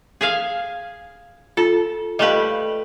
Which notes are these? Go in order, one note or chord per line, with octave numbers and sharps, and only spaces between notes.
G#4 E5 F5
F4 A4
G3 A3 B4 D#5 F5